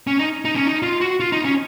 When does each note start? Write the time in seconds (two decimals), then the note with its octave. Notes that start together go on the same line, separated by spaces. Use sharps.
0.07 C#4
0.19 D#4
0.45 D#4
0.56 C#4
0.67 D#4
0.83 F4
1.01 F#4
1.20 F4
1.32 D#4
1.45 C#4